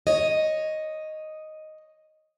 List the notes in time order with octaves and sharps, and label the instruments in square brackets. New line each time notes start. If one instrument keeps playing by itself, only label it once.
[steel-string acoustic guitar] C#5 D#5